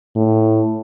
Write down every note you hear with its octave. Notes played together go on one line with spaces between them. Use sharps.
A2